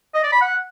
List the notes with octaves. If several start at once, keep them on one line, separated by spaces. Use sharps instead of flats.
D#5
D5
B5
F#5